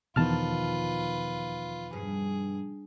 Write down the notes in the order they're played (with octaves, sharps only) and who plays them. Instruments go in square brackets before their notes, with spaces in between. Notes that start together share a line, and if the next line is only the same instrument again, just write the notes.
[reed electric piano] E2 A5 F6 [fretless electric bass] B2 D#3 F3 [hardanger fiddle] F4 B4
[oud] G2 [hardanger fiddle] G#4